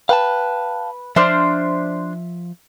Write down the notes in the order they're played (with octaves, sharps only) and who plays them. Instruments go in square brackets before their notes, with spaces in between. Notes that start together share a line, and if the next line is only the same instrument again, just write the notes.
[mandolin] B4 [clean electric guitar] F5 G5 A5
[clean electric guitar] F3 E5 [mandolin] D4 C5 F6